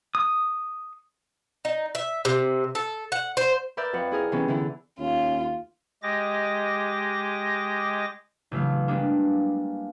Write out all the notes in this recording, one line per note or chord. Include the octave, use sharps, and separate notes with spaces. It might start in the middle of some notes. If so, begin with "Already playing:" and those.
D#6
D#4
E5
C3
A4
F#5
C5
A#4 B4 D5 E5 G6
F2 B4 F#5
E4 G#4 A#4
C3 E3 B3 C#4 D4
D3 E3 E4
D#2 C#4 F4
G#3 G4 D#5 D6 A#6
A1 C#3 F#3 A3 F5
G3 G#3 A#3 B3 D4